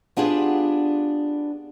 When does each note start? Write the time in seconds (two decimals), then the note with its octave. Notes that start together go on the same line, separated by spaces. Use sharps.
0.17 B3 D4 F4 G4 G#4